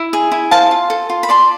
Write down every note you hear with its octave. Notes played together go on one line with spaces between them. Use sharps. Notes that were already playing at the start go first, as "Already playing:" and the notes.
Already playing: E4
G#4
E4
C5 F5 A5
F4
A4
F4
B5
D5 A5 C6